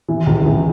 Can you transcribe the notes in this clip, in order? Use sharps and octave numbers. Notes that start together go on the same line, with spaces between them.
E3
C#2
E3